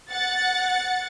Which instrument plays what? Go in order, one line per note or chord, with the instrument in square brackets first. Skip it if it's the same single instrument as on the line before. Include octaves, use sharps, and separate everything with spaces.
[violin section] F#5 A6 C#7